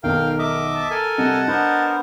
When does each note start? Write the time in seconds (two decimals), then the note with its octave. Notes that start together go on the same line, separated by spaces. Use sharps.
0.04 B1 E2 D#3 A#4 F5 G5
0.39 D#5 E5 D6
0.75 A5
0.91 A4 A#4 G#5
1.18 C3 G3 D#5 F#5 A5
1.48 B3 D4 A#4 C5